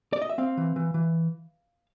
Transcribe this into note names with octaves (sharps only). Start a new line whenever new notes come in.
D5
D#5
E5
C4 F5
E3
E3
E3